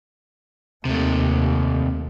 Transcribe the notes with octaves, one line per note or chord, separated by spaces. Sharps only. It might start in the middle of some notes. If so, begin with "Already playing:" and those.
D#2 C3 A3